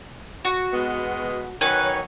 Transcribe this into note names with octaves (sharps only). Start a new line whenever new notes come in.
F#4
B2 G#3 B3
D#3 F#3 B4 C#5 G#5